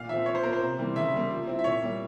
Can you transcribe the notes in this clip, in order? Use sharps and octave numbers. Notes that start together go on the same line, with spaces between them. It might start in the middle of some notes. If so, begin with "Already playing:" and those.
Already playing: A#2 F5
F3 C4 E5
F3 C#5
C5
A#3 F4 A#4
C5
C3
E3 G3 A#3
C#3 E5
G3 A#3
F3
C4 E4
E5
A#2 C#5
G3 A#3